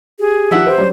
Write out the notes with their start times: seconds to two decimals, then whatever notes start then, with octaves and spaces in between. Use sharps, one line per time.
0.19 G4 G#4
0.51 D#3 F3 D5 E5 F#5
0.67 B4 C5
0.78 F#3 G3 C#5